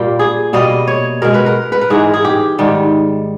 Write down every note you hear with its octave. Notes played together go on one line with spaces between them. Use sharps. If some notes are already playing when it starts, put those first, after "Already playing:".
Already playing: A#2 G3 A#3 G4
G#4
B2 G3 A#3 D#5
C#5
B2 G#3 A#4
B4
A#4
B4
A#4
G#2 E3 G#3 G#4
G#4
G4
G#2 D#3 G3